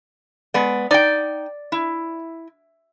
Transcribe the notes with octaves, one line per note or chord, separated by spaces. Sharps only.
G#3 B3 D5
D#4 D5 G5
E4